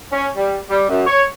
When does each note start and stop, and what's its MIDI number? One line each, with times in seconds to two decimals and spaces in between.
0.13 0.29 61
0.37 0.59 55
0.70 0.86 55
0.89 1.05 42
1.07 1.23 73